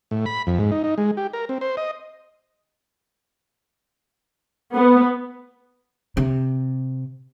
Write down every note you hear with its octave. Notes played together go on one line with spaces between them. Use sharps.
A2
B5
F2
G#2
D#4
D#4
G#3
G4
A#4
C4
C5
D#5
B3
C3